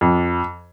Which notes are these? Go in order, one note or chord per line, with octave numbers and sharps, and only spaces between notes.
F2